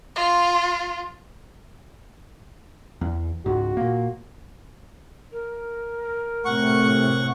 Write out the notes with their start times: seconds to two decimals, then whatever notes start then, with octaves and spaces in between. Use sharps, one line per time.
0.16 F4
3.01 E2
3.46 C#2 G#2 F#4
3.77 A#2 A#3
5.32 A#4
6.45 A2 C3 F#5 C#6